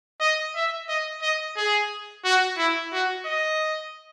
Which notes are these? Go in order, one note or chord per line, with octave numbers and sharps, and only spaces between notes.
D#5
E5
D#5
D#5
G#4
F#4
E4
F#4
D#5